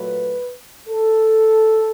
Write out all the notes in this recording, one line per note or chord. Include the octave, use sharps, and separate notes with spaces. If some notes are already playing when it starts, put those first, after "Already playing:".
Already playing: A#2 F#3 A3 B4
A4